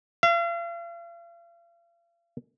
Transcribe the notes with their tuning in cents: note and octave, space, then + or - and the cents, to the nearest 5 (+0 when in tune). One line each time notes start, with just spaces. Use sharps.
F5 -40